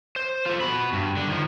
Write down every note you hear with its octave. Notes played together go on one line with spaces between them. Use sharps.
C5
F4 A4
F#4 B5
G2
D3
D#3 F3